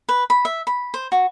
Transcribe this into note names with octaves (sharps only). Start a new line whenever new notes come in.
B4
B5
E5
B5
C5
F#4